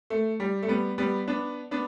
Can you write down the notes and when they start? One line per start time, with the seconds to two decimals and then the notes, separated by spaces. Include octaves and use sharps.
0.10 A3
0.40 G3
0.63 A3
0.68 G3 B3
0.98 G3 B3
1.27 B3 D4
1.71 B3 D4